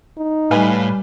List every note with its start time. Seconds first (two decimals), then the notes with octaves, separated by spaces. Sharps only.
0.18 D#4
0.51 A2 G3 B4 F5 G#5